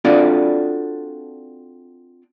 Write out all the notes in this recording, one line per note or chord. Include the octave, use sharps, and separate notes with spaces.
C4 D4 F4 F#4 A4 D5